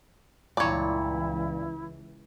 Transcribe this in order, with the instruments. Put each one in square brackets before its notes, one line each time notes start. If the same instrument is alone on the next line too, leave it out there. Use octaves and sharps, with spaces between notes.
[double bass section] C#2 E3 [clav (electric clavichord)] G2 A#2 [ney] E4 [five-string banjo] C#5 D5